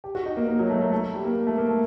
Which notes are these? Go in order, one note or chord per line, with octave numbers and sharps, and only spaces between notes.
G4
F#4
D#4
A#3
A#3
F#3
A3
A3
A3
G3
A#3
A3
A#3
A3